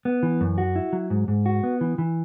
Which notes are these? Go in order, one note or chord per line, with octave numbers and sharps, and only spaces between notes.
B3
E3
F#2
F#4
E4
F#3
G#2
G#2
F#4
B3
E3
E3